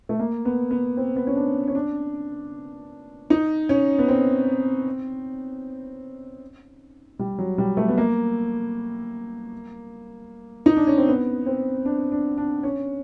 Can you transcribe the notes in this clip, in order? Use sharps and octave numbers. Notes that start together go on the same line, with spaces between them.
A3
A#3
B3
B3
C4
B3
C#4
D4
C#4
D4
D#4
C#4
B3
C4
G3
F#3
G3
A3
B3
A#3
D#4
D4
C#4
C4
B3
C4
D4
D4
D4
C#4